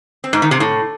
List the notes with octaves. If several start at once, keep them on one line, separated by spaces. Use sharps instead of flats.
C4
G#2
D#3
C3
A2